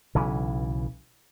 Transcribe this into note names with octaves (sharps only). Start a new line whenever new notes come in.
B1 C#3 E3